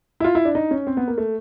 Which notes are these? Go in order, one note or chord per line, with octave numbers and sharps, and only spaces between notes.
E4
F4
E4
D4
D#4
C#4
C4
B3
A#3
A3